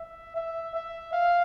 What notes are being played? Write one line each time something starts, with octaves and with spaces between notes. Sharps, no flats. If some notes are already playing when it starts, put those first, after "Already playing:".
Already playing: E5
E5
E5
F5